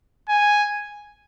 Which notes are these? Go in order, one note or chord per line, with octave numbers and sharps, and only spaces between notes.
G#5